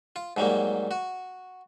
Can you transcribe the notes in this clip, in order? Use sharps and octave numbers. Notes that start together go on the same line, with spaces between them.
F4
G#2 F#3 G3 A#3
F#4